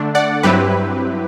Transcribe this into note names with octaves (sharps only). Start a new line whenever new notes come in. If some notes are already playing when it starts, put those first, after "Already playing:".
Already playing: D3 A3 D4
D5 F#5
G2 F#3 C4 E4 G4 B4